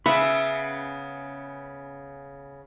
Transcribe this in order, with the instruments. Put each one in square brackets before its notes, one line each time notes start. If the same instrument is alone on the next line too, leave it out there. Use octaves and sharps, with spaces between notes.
[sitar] C#3 B3 [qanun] E5 F#5 [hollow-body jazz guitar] B5